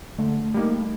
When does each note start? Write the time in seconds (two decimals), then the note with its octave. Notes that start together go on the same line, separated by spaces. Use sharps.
0.19 D3 A3
0.54 G3 A#3 D#4